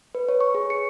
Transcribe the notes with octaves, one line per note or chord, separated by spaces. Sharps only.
B4
C#5
C#6
G#4
C#7